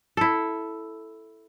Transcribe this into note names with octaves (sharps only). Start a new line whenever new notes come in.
E4 A4